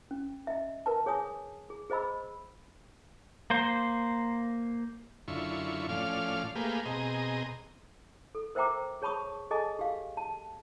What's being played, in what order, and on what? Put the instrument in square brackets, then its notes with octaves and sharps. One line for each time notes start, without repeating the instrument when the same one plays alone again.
[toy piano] C#4
D#5 E5
A#4 B4 A5
G#4 C#5 G#5 D#6
G#4
G#4 C5 D#5 B5 E6
[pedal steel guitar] A#3 C5
[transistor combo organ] F#2 D3 E4 F4 C#6
A2 F3 C#4 D5 F5 F6
A3 A#3 G4 G#4 B4 F5
B2 C4 G#4 D#5 A#5
[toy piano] A4
A#4 C5 E5 G5 A#5 D6
G#4 C#5 A5 B5 C#6 D#6
G#4 A4 D#5 G#5 A5
G4 F5
A5